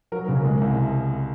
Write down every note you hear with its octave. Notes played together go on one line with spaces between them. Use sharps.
F#3 A#4
C#3 A#4
G#3
C2